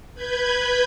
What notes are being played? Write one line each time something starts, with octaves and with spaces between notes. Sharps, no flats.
B4 B5 G6 G#6